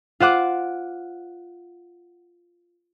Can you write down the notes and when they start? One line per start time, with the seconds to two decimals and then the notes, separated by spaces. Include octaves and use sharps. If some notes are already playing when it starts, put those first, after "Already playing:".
0.20 F4 C5 F#5 D6